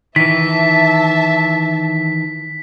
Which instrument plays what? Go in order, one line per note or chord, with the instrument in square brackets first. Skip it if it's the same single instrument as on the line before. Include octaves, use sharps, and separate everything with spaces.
[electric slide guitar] D#3 E3 [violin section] E5 A5 [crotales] B6